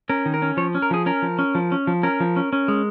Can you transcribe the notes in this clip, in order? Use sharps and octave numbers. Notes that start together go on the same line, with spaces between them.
C#4 A#4
D#3
A#4
C#4
F3 C#5
C#4
A#4
F3 G#4
C#4 A#4
F3
C#4
F3
C#4
F3
C#4 A#4
F3
C#4
C#4
G#3